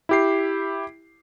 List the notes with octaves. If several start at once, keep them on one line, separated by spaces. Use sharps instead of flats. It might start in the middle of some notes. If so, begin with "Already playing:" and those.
E4 G4 C7